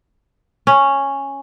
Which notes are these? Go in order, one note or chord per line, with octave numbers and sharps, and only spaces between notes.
C#4